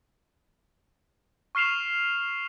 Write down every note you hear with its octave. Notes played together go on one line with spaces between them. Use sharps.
C#6 F6 C7 E7 F7